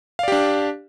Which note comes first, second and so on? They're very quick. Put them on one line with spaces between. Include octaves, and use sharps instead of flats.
F5 D5 G4 D4